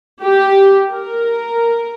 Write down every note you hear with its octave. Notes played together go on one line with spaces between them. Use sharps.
G4
A#4